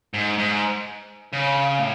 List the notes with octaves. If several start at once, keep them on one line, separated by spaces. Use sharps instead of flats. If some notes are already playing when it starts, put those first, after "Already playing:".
G#2
G#2
C#3
A2